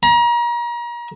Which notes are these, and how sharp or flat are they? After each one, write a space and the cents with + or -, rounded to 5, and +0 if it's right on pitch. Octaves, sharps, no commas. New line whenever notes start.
A#5 +35